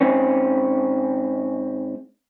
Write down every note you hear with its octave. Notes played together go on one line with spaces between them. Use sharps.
G#2 C4 C#4